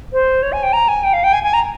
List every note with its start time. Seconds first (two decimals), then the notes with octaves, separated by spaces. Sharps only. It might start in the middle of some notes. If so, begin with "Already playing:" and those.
0.13 C5
0.42 C#5
0.52 G#5
0.63 G5
0.73 A#5
0.88 G#5
1.03 G5
1.13 F5
1.24 G5
1.33 G#5
1.43 G#5
1.53 A#5